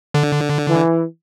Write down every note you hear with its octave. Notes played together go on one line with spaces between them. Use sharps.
D3
E3